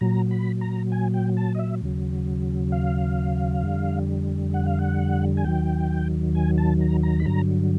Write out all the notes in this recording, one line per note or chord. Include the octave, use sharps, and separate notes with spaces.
A#2 F#3 A#5
B5
A#5
G#5
G5
A5
D#5
E5
D#2 C#3 F#3
F5
F2 D3 G3
F#5
F5
F#5
G#5
D#2 D#3 F#3 G5
G#5
A5
A#5
A#5
B5
G2 D3 F#3 A#5